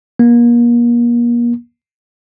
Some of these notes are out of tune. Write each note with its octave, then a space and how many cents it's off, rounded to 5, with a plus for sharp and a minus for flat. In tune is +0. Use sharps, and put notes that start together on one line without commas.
A#3 +35